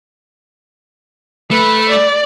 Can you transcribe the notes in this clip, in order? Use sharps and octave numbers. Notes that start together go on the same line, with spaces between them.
A3 B4
D5